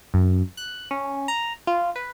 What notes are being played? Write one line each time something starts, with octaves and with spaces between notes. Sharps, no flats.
F#2
F#6
C#4
A#5
F4
B4